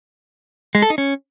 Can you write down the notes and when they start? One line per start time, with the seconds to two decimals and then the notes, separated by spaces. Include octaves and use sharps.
0.75 G#3
0.82 A4
0.90 D#4
0.98 C#4